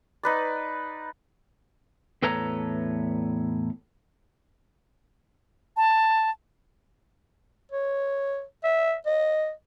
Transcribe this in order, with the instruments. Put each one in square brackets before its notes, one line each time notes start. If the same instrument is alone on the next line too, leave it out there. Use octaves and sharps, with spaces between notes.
[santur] D#4 B4 D5
[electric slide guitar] E2 A2 A4 B4 C#5 A#5
[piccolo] A5
[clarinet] C#5
E5
D#5